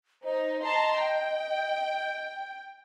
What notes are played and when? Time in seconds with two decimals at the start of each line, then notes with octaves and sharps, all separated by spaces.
0.24 D#4 C5
0.63 D#5 A5 A#5 C6
0.97 G5